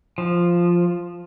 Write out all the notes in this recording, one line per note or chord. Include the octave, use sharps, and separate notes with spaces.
F3